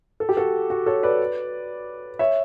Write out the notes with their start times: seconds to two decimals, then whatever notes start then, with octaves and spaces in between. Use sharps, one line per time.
0.20 A4
0.29 G4
0.37 F#4 A4
0.70 F#4
0.86 A4 C#5
1.03 B4 D5
2.19 C#5 E5